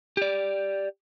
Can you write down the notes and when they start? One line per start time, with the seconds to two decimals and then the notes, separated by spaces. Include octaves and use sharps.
0.17 G4 D5